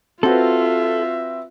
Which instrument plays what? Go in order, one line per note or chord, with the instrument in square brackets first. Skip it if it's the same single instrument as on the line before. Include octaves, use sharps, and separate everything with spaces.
[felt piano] C4 F#4 B4 [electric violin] F4 [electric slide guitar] A4 [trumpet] E5